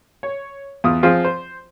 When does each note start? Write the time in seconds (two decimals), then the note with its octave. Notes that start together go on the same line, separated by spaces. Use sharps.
0.23 C#5
0.84 E2 F4 D#6
1.03 F3 C4 F4 G#4
1.25 C5